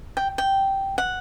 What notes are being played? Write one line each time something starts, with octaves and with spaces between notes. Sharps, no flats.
G5
G5
F#5